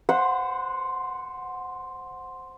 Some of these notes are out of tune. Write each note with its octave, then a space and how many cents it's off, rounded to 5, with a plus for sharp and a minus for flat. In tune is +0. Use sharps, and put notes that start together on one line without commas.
C5 +0 F#5 -10 C6 -45